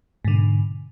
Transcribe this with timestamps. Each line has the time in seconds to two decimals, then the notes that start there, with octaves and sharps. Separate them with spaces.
0.25 G#2
0.28 D3
0.31 B2